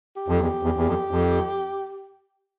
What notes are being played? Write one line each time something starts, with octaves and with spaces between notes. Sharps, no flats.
G4
F2
E2
E2
E2
F2
F2